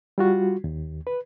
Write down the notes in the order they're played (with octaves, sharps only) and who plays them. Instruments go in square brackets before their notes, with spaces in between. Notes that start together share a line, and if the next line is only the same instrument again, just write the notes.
[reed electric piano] G3 F4 F#4
D#2
B4